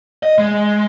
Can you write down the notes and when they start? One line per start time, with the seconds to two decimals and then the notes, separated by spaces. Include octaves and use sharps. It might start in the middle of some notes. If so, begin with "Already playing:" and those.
0.23 D#5
0.38 G#3